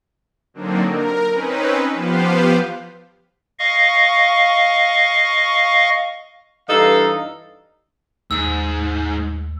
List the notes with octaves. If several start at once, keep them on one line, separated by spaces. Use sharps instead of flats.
D3 F#3 A#3 C4 D4 D#4
A#4
C4 C#4 D#4 B4
F3 B3 G4 B4 C5 F5
D#5 F5 C#6
G2 E3 D#4 A4 F5 A#5
D#2 G#2 E6